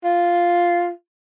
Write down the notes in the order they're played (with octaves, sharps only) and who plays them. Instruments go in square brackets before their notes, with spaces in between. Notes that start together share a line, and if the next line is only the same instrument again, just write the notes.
[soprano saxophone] F4